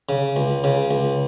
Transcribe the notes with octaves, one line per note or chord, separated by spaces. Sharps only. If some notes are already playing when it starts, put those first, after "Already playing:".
C#3
C#2
C#3
C#2